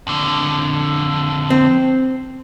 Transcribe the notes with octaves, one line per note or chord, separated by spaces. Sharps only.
F2 D3
C4